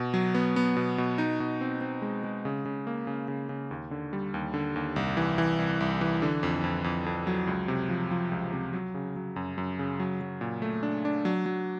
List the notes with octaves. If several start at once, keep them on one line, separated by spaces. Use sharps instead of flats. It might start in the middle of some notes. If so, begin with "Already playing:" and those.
Already playing: B2
F#3
B3
B3
B2
B2
D#4
B2
C4
C4
G#3
G#3
C#3
C#3
A#3
C#3
C#3
C#3
D#2
D3
G3
D#2
D3
D#2
C2
E3
E3
C2
C2
E3
D3
F2
F2
F2
F2
F#3
C#2
C3
F3
F3
C#2
C3
F#3
C#3
F#3
F#2
F#2
C#3
F#3
F#3
A#2
A3
D4
D4
F#3
F#3